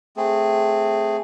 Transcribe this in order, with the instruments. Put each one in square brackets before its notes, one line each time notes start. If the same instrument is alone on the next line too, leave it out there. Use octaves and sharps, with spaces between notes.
[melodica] A3 C4 G#4